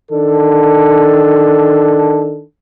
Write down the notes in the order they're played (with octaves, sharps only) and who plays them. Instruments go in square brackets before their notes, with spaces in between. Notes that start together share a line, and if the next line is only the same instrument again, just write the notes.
[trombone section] D#3 D4 A4